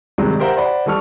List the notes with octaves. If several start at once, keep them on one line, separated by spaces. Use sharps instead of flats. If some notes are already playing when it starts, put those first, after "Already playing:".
G2 C3 D#3 F#3 G#3
G4 A#4 C5 E5 F#5 G5
C5 D5 F#5 B5
E3 G3 A4 C#6 F6